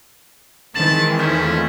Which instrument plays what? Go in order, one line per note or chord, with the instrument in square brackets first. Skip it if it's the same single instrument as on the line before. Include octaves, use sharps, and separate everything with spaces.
[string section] D#3 E3 C4 [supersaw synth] G#3 [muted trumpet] A5 [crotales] A6 E7 F#7
[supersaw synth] E2 A3 F4 [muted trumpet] C#4 [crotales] F6 G6 B6